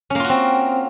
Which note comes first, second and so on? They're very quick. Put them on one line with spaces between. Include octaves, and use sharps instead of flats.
C#4 A#3 F4 F#4 C4